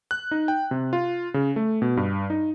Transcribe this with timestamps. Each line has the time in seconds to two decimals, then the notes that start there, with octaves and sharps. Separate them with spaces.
0.11 F#6
0.31 D#4
0.48 G5
0.71 C3
0.93 F4
1.34 C#3
1.56 A3
1.82 B2
1.97 G2
2.30 D#4